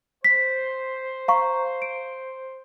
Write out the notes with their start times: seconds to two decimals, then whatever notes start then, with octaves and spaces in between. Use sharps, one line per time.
0.24 C5 B6
1.28 F5 A#5 C#6
1.82 D7